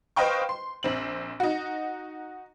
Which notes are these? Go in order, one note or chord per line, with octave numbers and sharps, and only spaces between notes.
B4 C5 D#5 F5 G5 C#6
C6
A#1 C4 F#7
D#4 F#4